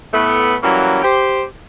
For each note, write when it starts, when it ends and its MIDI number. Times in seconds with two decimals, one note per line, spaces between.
0.13 0.55 45
0.13 0.55 57
0.13 0.55 59
0.63 1.02 52
0.63 1.02 54
0.63 1.02 55
0.63 1.02 58
0.63 1.02 61
1.03 1.43 67
1.03 1.43 72